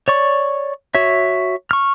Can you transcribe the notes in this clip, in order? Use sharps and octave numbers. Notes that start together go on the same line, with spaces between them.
C#5 D5 C#6
F#4 C#5 E5
C#6 F6